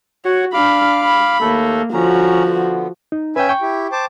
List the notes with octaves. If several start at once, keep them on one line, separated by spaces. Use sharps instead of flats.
F#4 C#5 F#5
D4 F5 B5 D6 F6
B5
D#2 A3 A#3 A4
D3 F3 C#4 F#4 A#5
D3 B3
D#4
C#4 B4 E5 G5 G#5
G5 C#6
E4 G4
C5 A5 D6